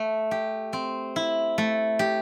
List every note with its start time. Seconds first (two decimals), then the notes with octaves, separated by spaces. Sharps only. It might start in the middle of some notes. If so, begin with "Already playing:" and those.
Already playing: A3
0.31 G4
0.73 C4
1.16 E4
1.58 A3
1.99 G4